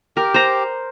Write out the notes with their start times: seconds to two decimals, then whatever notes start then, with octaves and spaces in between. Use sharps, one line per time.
0.17 G4 A#4
0.34 C5 A#5